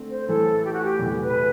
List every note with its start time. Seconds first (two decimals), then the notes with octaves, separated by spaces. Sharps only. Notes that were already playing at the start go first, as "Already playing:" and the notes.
Already playing: D3 A3 C4
0.11 C5
0.28 A2 E3 A3 A4
0.64 G4
0.73 F#4
0.84 G4
0.99 E2 C3 E3 A3
1.23 B4